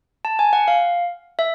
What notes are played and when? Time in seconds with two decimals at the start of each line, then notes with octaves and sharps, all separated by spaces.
0.25 A5
0.39 G#5
0.53 F#5
0.68 F5
1.39 E5